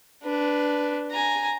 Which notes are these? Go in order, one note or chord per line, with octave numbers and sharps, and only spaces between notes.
D4 B4
G#5 A#5